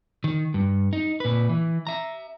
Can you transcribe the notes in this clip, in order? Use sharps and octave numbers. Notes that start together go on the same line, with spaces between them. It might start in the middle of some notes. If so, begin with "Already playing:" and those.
D#3
G2
D#4
A#2 B4
E3
E5 A#5